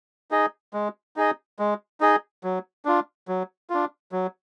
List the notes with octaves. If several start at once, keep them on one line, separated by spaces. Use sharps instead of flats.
D#4 G#4 D#5
G#3
D#4 G#4 D#5
G#3
D#4 G#4 D#5
F#3
D4 F4
F#3
D4 F4
F#3